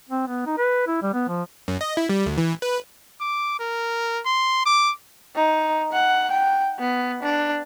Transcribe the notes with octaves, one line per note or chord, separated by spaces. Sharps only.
C4
B3
D#4
B4
E4
G3
B3
F3
F#2
D#5
E4
G3
D2
E3
B4
D6
A#4
C6
D6
D#4
F#5
G5
B3
D4